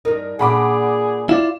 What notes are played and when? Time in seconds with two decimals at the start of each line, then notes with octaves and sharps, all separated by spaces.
0.05 G2 D#4 A#4
0.39 A#2 D4 G#4 F#5 B5 D6
1.29 E4 F4 D5 E7